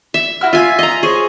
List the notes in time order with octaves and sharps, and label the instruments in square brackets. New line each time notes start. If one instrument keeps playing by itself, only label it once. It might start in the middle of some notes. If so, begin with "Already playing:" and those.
[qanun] E5
[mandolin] E4 F#4 F6
[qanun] F4 G#5 [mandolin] E5
[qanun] D#5 A#5
[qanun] G#4 [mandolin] C5 C#5